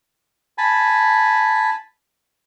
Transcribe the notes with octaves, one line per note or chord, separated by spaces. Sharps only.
G#5 A5 B5